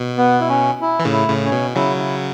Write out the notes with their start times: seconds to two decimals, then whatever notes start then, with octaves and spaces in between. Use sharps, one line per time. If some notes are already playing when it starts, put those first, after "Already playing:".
Already playing: B2
0.18 B3
0.40 E4
0.49 C#4
0.81 E4
1.00 E3
1.05 A2 C#3
1.12 E4
1.28 A2 C#3
1.45 C#4
1.52 B2
1.76 C#3 F#3 E4
1.99 E4